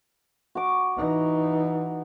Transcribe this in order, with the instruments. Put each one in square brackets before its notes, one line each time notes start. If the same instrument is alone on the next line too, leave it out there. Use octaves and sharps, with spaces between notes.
[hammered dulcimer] F#4 D6
[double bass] E3 D#4